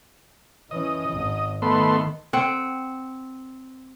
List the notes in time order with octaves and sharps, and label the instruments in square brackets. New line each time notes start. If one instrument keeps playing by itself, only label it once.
[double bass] E3 C#4 [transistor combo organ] D#5
[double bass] G#1
[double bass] D#3 [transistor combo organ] A3 B3 C6
[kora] C4 F#5